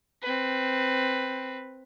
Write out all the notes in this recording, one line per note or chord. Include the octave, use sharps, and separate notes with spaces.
C4 B4